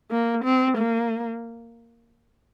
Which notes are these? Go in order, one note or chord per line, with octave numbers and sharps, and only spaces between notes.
A#3
C4
A#3